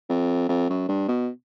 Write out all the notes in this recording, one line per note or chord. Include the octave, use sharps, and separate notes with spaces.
F2
F2
F#2
G2
B2